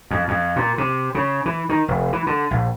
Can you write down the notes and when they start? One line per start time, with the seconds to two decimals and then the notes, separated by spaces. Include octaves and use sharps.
0.11 F2
0.28 F2
0.56 A#2
0.78 C3
1.15 C#3
1.46 E3
1.69 D#3
1.88 F1
2.13 E3
2.27 D3
2.51 A#1